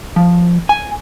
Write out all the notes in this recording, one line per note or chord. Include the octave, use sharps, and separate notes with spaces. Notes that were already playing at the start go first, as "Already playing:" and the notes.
F3
G#5